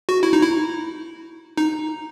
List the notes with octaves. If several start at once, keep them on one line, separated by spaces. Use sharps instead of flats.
F#4
E4
D#4
E4
D#4